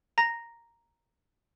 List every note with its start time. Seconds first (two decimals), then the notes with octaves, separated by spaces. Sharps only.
0.18 A#5 A#6